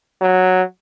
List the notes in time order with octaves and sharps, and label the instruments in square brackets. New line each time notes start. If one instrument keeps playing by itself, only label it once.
[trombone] F#3